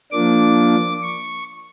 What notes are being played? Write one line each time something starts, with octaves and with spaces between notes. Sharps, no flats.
F3 A#3 D4 D6
C#6